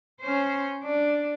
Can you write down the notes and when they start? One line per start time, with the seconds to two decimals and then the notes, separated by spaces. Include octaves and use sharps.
0.21 C#4 C5
0.84 D4